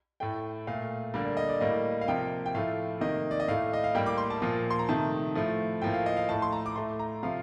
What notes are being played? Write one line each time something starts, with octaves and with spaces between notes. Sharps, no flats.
A2 A3 G5
A#2 A3 F5
D3 G3 A#3 D5
D5
D#5
D5
A2 G3 A#3 D#5
F5
C3 F3 A#3 G5
G5
A2 F3 A3 F5
C3 D#3 A#3 D#5
D5
D#5
A2 A3 F5
D#5
F5
A2 G3 A#3 G5
D6
C6
A5
A#2 F3 A#3
C6
A#5
C3 D#3 A3 A5
A2 F3 A3
A2 F3 A#3 G5
F5
D#5
F5
A2 A3 A5
C6
A#5
D6
A2 A3 C6
A#5
C3 F3 A3 F5